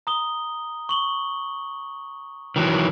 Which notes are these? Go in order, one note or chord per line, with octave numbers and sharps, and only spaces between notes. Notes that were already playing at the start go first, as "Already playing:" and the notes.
A#5 D#6 G7
C#6 F#7 G7
D#3 E3 F#3